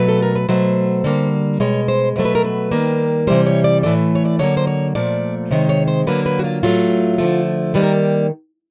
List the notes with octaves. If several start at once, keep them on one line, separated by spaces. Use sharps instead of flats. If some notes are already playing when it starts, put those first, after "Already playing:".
Already playing: B2 F#3 A3 B4
A4
A#4
B4
B2 F#3 A3 C5
D3 G3 A#3
B2 G#3 C#5
C5
B2 F#3 A3 C5
B4
A#4
B4
D#3 G3 A#3
C3 E3 G3 C5
C#5
D5
A2 E3 A3 D5
C#5
D5
D3 F#3 A#3 C#5
C5
C#5
A#2 F3 A3 D5
C3 D#3 G#3 C#5
C#5
C5
D3 F#3 A#3 B4
B4
F#4
F4
A2 F#3 A3 F4
D3 F3 A3
D#3 G3 A#3 B4
A#4